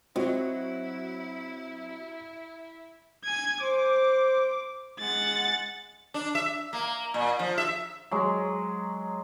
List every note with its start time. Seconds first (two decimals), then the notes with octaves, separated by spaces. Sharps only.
0.16 F#3 C4 E4 F#4 D#5
3.25 G#5 G#6
3.62 C5 D6
5.00 G#3 F#5 A6
6.14 D4
6.35 E5
6.73 A#3
7.14 A#2
7.39 F3
7.58 E5
8.11 F#3 G#3